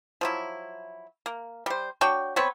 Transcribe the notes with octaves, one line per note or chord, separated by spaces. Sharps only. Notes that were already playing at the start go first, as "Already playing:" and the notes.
F3 F#3 E4
A#3
G3 C5
D4 F#4 C#5 G5
B3 C4 B4 C#5